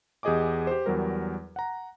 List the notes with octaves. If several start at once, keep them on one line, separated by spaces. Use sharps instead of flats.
E2 G4 G#4 D#5 G#5 D6
G4 C5
E2 F#3 G3 A#4
F#5 A#5